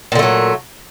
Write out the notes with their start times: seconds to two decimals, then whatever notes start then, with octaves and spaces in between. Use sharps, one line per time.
0.12 A#2
0.15 D3
0.19 A3
0.23 F#3